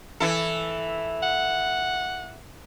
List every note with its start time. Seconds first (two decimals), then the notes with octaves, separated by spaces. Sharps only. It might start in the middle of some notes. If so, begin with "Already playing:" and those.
0.20 E3 E4 A4
1.23 F#5